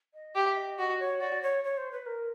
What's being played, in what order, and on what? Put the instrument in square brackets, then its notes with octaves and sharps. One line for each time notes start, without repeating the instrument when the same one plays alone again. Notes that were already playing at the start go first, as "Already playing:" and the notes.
[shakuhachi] D#5
[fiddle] G4 [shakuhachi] E5
[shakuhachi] D#5
[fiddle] F#4 [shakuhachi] D#5
[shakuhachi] C#5
[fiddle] F#4 [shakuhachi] D5
[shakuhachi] C#5
C#5
C5
B4
A#4